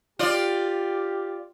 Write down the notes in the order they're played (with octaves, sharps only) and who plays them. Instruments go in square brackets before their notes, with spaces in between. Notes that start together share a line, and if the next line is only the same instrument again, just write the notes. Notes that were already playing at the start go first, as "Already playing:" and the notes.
[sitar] F4 D5 [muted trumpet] G4